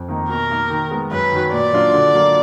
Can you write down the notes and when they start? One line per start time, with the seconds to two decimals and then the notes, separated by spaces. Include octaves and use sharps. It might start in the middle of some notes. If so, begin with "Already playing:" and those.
Already playing: F2
0.08 D#3 A#3 D#4
0.29 B2 A#4
0.50 A#3 D#4
0.70 D#3
0.91 G#3 B3
1.11 F#2 B4
1.32 D#3 F#3
1.52 A#2 D5
1.73 F#3 D4 F4
1.93 D3
2.14 F#3 A#3 F4